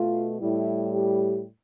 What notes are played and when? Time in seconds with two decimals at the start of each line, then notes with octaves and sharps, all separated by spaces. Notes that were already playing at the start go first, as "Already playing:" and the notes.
Already playing: B2 A3 F4
0.40 A2 G3 E4
0.93 G4